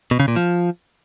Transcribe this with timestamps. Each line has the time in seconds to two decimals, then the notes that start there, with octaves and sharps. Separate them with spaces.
0.11 B2
0.20 C#3
0.28 A#2
0.36 F3